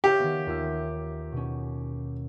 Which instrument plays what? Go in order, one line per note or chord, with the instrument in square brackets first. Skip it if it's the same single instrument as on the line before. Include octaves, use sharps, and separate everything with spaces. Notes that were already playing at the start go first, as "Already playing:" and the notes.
[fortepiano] G4 [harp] C#5 E5 F5
[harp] D#3 B3
D#2 F4 E5
B2 C#4